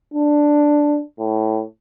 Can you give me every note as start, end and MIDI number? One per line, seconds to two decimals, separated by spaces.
0.14 1.02 62
1.19 1.63 45